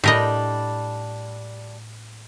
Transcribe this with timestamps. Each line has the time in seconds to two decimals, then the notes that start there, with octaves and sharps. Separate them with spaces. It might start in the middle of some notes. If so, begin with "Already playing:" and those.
0.04 A2 G3 D4 A#4 D#5